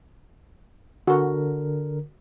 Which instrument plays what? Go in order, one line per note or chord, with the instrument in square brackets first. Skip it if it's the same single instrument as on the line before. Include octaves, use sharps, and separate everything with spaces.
[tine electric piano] D3 A#4 [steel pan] F#4